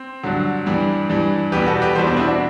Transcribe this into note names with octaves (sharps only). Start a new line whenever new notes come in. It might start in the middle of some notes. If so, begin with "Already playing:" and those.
Already playing: C4
G2 D3 F#3
G2 E3 G3
G2 E3 G3
E2 B2 G3 G4 B4
F#4 A4
G4 B4
E2 B2 G3 A4 C5
B3 D4
C4 E4
D4 F#4